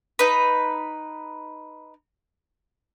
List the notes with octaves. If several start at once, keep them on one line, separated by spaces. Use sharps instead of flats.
D#4 B4